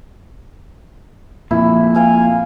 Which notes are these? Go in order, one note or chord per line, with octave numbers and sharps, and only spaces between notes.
F2 A#2 E4
F5 G5 G#5